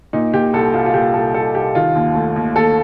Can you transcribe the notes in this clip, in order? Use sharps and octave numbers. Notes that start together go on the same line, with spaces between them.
A#2 D#4
A#2 G4
C2 A4
C2 F4
F4
A#2 G4
C2 A4
C2 A4
C2 G4
D#3 F4
D#2
A3
D#2
D#2 A4